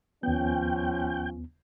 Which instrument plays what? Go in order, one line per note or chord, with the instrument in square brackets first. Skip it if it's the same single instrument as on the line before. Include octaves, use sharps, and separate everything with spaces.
[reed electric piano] D#2 B3 [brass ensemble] F3 C#4 [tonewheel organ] G5